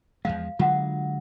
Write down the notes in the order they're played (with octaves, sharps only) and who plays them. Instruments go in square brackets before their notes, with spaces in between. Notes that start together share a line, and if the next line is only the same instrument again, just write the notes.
[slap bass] E2 F3 G#3 [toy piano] F5
[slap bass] D3 F#3 G#3 [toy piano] F4 F#5